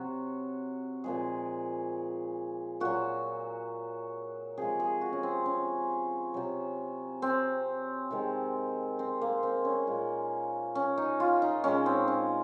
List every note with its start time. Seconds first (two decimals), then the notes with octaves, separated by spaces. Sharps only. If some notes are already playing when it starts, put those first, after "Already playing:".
Already playing: C3 F#3 F#4
1.04 A#2 F3 G#3 G#4
2.80 A#2 F#3 F#4
4.57 C3 F3 G#3 G#4
4.80 G#4
5.01 F#4
5.13 C#4
5.23 C4
5.46 C#4
6.34 C3 F#3
7.22 C4
8.11 C3 D#3 G#3
8.99 C4
9.21 A#3
9.43 C4
9.65 C#4
9.87 A#2 G#3
10.75 C#4
10.98 D#4
11.20 F4
11.42 D#4
11.64 A#2 G#3 C#4
11.86 C4
12.08 C#4